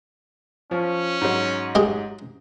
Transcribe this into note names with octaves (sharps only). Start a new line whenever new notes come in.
F3 C#4
G#2 F#3
G#3 G4 G#4